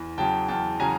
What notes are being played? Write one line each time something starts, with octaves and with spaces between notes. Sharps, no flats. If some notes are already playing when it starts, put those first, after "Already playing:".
Already playing: E2
C#3 F#3 G5 A5
E2 G5 A5
C#3 F#3 G#5 A#5